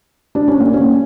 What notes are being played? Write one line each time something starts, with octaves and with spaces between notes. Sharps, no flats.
D4
C#4
A#3
C#4